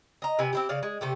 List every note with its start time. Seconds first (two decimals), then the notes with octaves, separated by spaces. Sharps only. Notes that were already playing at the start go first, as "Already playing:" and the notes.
0.22 D#5 A#5
0.39 C3 E4 B4 G#5
0.53 C4 E4 G4
0.69 C#3 D5 F5
0.83 G#3
1.01 C3 A3 G4